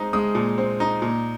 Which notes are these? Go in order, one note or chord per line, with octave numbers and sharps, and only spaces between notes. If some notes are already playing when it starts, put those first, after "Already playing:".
Already playing: G#3 C4 D#4
G#3 D#6
A#2
C4
D#4
A#2